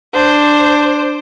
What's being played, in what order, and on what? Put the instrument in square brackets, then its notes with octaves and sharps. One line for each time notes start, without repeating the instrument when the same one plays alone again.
[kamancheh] D4 C5